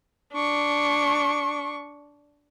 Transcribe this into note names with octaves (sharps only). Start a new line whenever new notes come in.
D4 C#6